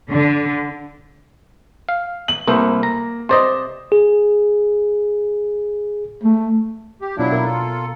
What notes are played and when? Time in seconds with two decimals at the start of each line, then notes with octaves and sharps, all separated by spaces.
0.11 D3
1.89 F5
2.28 F#7
2.48 C2 A3 A#3 C5
2.83 A#5
3.29 C3 C5 D5 D#5 C6
3.92 G#4
6.24 A3
7.01 G4
7.18 B2 F#3 D4 E4 F4
7.32 B2 A#4
7.45 F4 A4